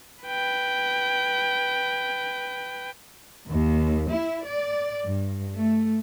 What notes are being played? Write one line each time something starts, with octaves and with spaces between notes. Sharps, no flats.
B4 G5
D#2
E4
D5
G2
A3